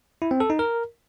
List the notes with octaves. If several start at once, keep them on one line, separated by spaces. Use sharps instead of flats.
E4
C4
A4
D#4
A#4